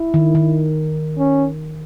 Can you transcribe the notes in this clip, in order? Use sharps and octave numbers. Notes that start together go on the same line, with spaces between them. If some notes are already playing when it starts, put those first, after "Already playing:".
Already playing: E4
D#3
D#3
C#4